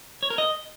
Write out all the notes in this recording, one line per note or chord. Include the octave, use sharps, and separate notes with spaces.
C#5
A#4
D#5